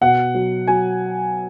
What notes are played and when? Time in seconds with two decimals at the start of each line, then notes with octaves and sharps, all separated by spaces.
0.01 B2 F#5
0.34 F#3
0.67 F#3 G#5